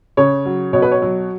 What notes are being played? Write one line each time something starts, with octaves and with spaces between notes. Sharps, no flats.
C#3 C#5
F#3
B2 C#5
B4
C#5
F#3